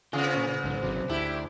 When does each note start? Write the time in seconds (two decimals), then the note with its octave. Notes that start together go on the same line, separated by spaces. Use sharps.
0.13 C#3 B3 C#4 F4 C5
0.35 A#2
0.64 B1 G#2 D#3 A4 C5
0.82 G#1 C3 F#3 G#4 C5 D5
1.09 D2 D4 E4 G4